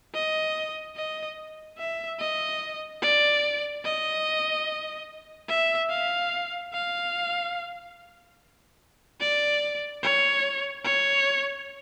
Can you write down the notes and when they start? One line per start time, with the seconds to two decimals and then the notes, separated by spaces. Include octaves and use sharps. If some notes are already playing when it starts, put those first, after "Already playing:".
0.14 D#5
0.96 D#5
1.78 E5
2.19 D#5
3.02 D5
3.85 D#5
5.49 E5
5.90 F5
6.73 F5
9.20 D5
10.03 C#5
10.84 C#5